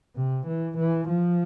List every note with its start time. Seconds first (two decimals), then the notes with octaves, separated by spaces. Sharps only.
0.16 C3
0.46 E3
0.78 E3
1.08 F3